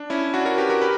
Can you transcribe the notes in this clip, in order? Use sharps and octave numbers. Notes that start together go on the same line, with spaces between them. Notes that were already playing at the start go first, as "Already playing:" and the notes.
Already playing: D4
C#4 E4
D4 F#4
F#4 A#4
G4 B4
F#4 A#4
G4 B4